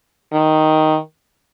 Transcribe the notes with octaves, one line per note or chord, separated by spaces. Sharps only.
D#3